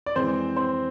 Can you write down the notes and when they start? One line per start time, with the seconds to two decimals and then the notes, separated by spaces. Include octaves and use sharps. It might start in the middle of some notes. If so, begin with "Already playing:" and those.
0.06 D5
0.15 F2 E3 G#3 C4 C5
0.56 C4 C5